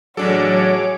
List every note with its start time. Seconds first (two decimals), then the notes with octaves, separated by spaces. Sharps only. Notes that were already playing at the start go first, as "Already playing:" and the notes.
0.17 A1 F#3 D4 F#4 G#4 A4 C#5 D6